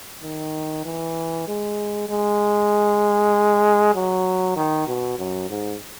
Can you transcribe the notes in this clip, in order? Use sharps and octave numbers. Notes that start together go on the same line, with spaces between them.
D#3
E3
G#3
G#3
F#3
D#3
B2
F#2
G#2